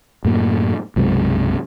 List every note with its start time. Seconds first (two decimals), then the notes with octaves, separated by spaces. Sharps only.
0.25 F#2 A2 A#3
0.96 B1 F#2 C3 G#3